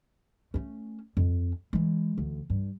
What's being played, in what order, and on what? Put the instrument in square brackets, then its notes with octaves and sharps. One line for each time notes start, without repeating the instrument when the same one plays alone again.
[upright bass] A3 C#4
F2
E3 G#3
D2
G2